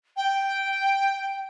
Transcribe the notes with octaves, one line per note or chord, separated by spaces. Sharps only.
G5